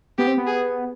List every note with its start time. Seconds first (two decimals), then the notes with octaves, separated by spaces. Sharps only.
0.18 B3 G4
0.27 C4
0.37 B3
0.47 G#4